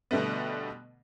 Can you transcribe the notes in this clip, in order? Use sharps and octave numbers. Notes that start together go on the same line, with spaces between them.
B2 D3 G3 A3 B3